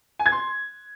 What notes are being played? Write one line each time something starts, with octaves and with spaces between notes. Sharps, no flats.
G#5
G#6
C6